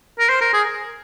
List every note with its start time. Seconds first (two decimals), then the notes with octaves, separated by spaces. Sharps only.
0.19 A#4
0.29 C5
0.41 A#4
0.53 G#4